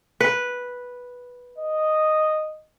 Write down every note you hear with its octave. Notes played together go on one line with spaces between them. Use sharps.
B4
D#5